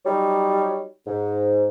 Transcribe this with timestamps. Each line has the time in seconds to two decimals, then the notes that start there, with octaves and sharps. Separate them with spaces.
0.06 F#3 G3 D#4 C#5
1.07 G#2